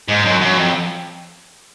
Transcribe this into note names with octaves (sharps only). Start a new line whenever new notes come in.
G#2
F#2
F#2
F2